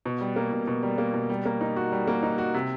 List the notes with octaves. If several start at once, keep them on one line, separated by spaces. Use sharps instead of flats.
B2
G3
A#3
B2
B2
G3
A#3
B2
G3
A#3
D#4
F#4
G3
A#3
D#4
F#4
C3